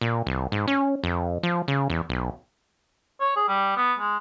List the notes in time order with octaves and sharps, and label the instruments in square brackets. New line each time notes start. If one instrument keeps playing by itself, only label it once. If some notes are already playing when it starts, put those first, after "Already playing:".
[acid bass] A#2
C2
G#2
C#4
F2
F3
C#3
E2
B1
[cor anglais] C#5
G#4
G3
B3
G#3